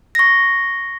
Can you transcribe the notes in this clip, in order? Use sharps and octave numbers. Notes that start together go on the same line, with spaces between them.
C#6 A#6